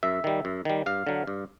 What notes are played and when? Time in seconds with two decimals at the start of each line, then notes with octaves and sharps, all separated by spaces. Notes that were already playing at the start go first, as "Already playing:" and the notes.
0.03 F#2 E5
0.24 D#3 G3
0.45 F#2
0.65 D#3 G3
0.86 G2 F5
1.07 D3 F#3
1.27 G2